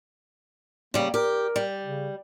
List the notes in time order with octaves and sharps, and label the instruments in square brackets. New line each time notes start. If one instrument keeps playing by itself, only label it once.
[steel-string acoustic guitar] C#3 G3 [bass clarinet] A#3
[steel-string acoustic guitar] G4 [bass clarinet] A#4
[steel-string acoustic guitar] G3
[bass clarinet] C#3